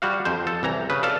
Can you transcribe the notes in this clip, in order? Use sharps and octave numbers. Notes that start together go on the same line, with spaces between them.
G3 F#4 F5
F2 C5
A4
C2 E3 A#5
C#3 B4
A4 D5 F5 A5